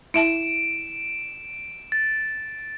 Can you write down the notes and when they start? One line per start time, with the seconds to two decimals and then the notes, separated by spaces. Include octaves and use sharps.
0.14 E4 E5 A5 D7 E7
1.92 A6